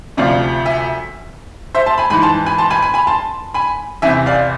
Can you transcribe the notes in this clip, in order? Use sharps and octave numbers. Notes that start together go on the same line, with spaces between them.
D2 C3 F3 D5 F5
E5 G#5
C5 E5
A5 C6
G#5 B5
G#2 E3 G#5 B5
A5 C6
G#5 B5
A5 C6
G#5 B5
G#5 B5
G#5 B5
A5 C6
G#5 B5
E2 C3 E3 E5 G#5
D5 F5